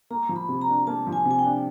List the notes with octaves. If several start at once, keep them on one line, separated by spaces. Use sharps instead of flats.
A#3 A#5
F3
B5
C3
A#5
D4
A#3 A5
F3
G#5
C3
G#5
G5
D4